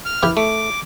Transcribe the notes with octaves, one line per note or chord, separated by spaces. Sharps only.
F6
E4 G4 B4
A3 D6